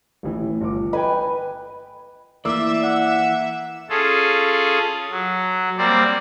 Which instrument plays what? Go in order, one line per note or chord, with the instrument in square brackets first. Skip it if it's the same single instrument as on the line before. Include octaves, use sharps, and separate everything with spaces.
[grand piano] A1 A2 E3
G1 D6
[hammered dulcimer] B4 G#5 [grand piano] D#5 G5
[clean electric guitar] E3 [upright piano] A#3 D6 E6 [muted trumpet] D5 [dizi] E5
[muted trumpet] F#5
[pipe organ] C#4 F4 G#4 A4
F#3
G3 A#3 C4 C5 D5